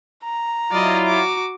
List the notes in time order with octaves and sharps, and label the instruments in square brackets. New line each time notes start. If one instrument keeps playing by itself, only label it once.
[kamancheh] A#5
[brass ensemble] F#3 E4 F4 [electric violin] D5 D#5
[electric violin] F#4 D6